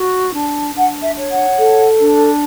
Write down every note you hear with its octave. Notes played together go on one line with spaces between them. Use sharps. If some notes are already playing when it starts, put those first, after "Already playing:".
Already playing: F#4
D4
D4 F#5
E5
C#5
F#5
A4
D4